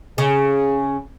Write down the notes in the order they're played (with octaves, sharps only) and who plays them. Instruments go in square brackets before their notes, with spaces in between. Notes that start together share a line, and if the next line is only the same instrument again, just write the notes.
[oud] C#3 [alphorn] G#4